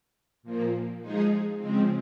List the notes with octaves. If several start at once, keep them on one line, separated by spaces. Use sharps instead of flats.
A#2 F3 A#3
F3 G#3 D#4 G#4
C#3 F3 G#3 C4